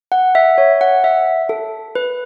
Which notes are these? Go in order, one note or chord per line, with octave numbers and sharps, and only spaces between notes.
F#5
E5
C#5
F#5
E5
A4
B4